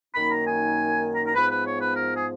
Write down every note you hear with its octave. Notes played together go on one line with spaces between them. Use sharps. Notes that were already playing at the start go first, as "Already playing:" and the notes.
F#2 D#3 A#3 D#4 B5
A#5
G#5
A#5
A#5
G#2 F3 B3 B4
B4
C#5
B4
A#4
G#4